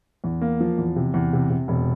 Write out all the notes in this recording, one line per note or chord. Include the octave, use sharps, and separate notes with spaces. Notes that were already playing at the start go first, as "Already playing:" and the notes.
E2
A#3
F3
E2
C3
E2
C3
C3
E1